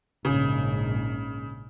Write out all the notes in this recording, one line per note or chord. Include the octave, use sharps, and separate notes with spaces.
A#1 G#2 C#3